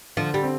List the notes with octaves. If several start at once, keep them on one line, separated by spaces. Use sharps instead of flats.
D3 F3
G3
C4